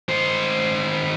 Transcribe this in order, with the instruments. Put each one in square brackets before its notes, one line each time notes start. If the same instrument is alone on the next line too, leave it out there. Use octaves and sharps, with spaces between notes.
[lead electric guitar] D#3 C5